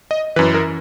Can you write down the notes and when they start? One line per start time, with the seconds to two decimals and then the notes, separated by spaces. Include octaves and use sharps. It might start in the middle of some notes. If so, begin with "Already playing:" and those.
0.11 D#5
0.36 F#2 E3 B4
0.54 A#4